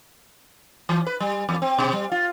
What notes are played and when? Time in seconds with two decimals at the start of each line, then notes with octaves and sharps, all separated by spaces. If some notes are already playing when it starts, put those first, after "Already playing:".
0.89 E3
1.07 B4
1.20 G3
1.49 E2
1.62 C4
1.79 B2
1.93 G3
2.12 F4